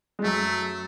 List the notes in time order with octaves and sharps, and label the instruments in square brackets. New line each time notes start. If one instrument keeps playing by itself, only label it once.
[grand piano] G#3
[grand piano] F#2 F#3 [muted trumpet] A3